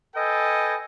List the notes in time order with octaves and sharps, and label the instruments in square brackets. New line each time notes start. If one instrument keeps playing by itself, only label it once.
[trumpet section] A4 B4 D#5 G5 G#5